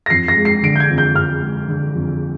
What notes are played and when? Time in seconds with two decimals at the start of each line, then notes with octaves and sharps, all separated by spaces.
0.06 A#6
0.10 F2 C7
0.28 A#6
0.37 G#3
0.45 C7
0.63 D3 D7
0.75 G6
0.80 G#6
0.90 F2
0.98 G6
1.15 F2 F6
1.42 G#3
1.68 D3
1.95 F2